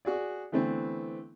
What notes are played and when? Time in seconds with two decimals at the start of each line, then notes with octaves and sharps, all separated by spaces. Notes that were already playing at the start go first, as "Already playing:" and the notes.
0.05 F#4 G#4 D5
0.52 D3 E3 A3 B3 C4